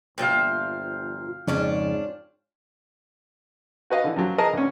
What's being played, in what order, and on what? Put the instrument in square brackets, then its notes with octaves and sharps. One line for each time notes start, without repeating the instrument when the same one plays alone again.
[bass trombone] G1 [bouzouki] A#2 F3 E5 [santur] F5 G5
[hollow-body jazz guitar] F2 C#3 [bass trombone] G#2 [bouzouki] C#4 D4 F4
[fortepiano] F#4 B4 D#5 F5
D3 E3
F#2 F3 F#3
G#4 A#4 B4 D#5 A5 A#5
D2 C#4